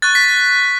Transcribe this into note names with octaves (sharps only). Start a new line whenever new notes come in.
C#6 F#6 A6
B6